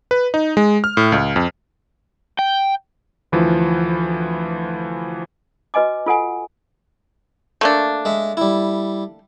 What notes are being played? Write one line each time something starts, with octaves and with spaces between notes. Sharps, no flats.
B4
D#4
G#3
F6
A2
C#2
F2
G5
D2 E3 F3
F#4 B4 D#5 G#5 D6
F4 A4 F#5 G#5
A3 A#3 D4
G#3 E5
G3 E4